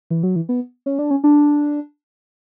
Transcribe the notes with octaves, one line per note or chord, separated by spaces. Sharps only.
E3
F#3
E3
B3
C#4
D4
C#4
D4